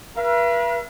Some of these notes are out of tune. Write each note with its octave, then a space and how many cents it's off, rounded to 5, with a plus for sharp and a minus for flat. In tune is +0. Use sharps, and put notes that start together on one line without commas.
B4 -40 E5 +45